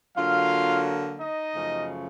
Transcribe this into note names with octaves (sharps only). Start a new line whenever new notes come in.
D3 F#3 A#3 F4 F5
D#4 D#5
F#2 C#3 F3 A3